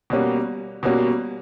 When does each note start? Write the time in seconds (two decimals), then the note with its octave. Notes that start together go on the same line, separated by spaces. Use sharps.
0.10 B2 G3 A#3 C#4 F#4
0.83 B2 G3 A#3 C#4 F#4